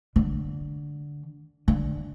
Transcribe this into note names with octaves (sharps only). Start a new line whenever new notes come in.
D3
D3